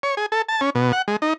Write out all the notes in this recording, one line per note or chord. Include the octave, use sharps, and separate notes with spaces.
C#5
G#4
A4
A5
C#4
B2
F#5
G#3
D#4